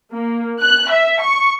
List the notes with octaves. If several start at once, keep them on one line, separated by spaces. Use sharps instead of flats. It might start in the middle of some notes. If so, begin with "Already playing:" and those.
A#3
F#6
E5
C#6